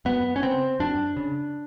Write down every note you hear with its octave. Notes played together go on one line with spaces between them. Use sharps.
F#2 B3
C#4
C#3 C4
F#2 D4
C#3